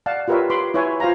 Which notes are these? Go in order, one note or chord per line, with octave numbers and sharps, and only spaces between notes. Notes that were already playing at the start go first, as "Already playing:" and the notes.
D5 F5 F#5 A5
F4 G4 A#4 B4 C#5 E5
B4 B5 C6 D6
E4 B4 C#5 E5 G#5
F4 C5 F5 G#5 A#5